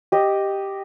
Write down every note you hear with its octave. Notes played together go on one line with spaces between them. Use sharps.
G4 D#5